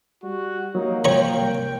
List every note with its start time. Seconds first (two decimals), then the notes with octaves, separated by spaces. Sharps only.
0.23 G3 F#4
0.75 F#3 A#3 D#4
1.05 C#5 G5 A#5
1.37 C2 G5